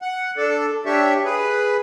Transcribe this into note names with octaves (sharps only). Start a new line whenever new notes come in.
F#5
D4 A4
D4 G4 C#5 E5
G#4 B4